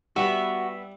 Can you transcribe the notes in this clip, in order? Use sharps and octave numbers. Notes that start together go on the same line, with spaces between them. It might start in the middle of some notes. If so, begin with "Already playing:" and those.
G3 B3 E4 F#4 E5